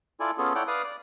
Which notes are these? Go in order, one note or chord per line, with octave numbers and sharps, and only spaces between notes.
E4 F4 A4 D5 G#5
B3 C#4 F4 G#4 A4
E4 A4 C#5 D5 F#5 G5
B4 D5 F5 D#6
D5